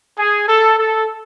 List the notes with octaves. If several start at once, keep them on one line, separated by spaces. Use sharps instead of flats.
G#4
A4
A4